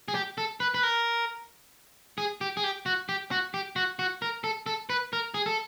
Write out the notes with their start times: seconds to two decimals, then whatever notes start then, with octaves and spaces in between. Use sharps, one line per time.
0.08 G#4
0.15 G4
0.38 A4
0.60 B4
0.74 B4
0.83 A#4
2.18 G#4
2.41 G4
2.57 G#4
2.64 G4
2.86 F#4
3.09 G4
3.31 F#4
3.54 G4
3.76 F#4
3.99 F#4
4.22 A#4
4.44 A4
4.66 A4
4.90 B4
5.13 A#4
5.34 G#4
5.46 A4